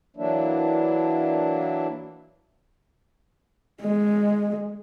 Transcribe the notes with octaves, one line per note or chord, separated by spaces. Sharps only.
E3 F#3 A#3 D4 E4
G#3